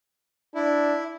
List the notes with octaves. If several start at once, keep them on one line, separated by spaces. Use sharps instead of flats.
D4 E4